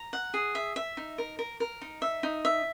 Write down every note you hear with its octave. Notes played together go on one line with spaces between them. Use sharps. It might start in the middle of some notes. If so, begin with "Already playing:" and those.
Already playing: A#5
F#5
G#4
E5
E5
D#4
A#4
A#4
A#4
D#4
E5
D#4
E5